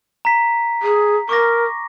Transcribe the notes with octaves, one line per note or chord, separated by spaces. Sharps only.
A#5 B6
G#4
A#4 C#6 D6 A#6